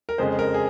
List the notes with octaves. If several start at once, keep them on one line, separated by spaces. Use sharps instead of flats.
A#4
F2 C#3 G#3 C5
A#4
G#4